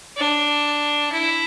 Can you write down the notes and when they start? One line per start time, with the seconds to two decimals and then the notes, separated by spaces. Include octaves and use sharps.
0.17 D4
1.12 E4